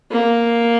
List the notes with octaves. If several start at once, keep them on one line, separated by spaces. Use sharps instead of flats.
A#3